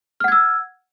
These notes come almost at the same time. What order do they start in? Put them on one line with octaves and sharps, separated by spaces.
F6 F#5 G#6 E6